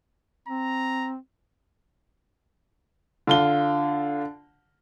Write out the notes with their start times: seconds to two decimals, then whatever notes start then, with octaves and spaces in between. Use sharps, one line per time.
0.48 C4 A#5
3.27 D3 F4 G7